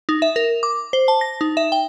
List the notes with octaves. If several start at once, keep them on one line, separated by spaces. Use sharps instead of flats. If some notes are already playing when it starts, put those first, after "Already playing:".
D#4
E5
A#4
D6
C5
A5
A#6
D#4
E5
G5